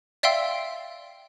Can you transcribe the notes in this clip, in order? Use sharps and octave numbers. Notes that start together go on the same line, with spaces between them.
D5 E5 F5 G5 C6 E6